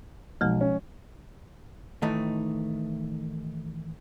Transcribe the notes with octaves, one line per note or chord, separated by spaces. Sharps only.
B1 F3 G#3
C#4
A2 D#3 E3 A3 D#4